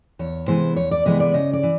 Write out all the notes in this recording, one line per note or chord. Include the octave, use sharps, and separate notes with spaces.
E2 C#5
C3 E3 G#3 B3 C5
E2 C#5
D5
C3 E3 G#3 B3 D#5
D5
C#3 D#5
D5
E3